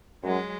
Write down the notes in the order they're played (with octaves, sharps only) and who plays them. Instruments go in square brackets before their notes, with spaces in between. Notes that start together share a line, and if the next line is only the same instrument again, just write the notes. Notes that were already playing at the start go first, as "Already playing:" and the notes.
[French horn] F#2 [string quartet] F#3 G#3